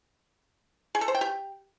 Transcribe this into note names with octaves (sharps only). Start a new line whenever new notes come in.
G#4
A4
C5
G5
G4